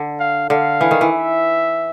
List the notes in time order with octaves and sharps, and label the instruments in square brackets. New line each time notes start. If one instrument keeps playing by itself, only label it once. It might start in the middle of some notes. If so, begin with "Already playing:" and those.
Already playing: [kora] D3
[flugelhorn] F5
[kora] D3 [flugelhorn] F5
[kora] E3
D#3
E3
[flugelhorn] E5